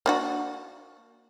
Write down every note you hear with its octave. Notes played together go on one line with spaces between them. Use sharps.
A#3 D4 F#4